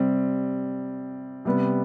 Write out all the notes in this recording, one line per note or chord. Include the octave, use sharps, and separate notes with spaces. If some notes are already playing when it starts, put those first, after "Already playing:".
Already playing: C3 G3 C4
C3 G3 B3